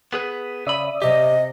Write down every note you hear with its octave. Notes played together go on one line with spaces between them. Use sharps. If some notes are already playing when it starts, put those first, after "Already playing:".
B3 G#4 B4
C#3 D5 E5 B5 D#6
C3 G4 D#5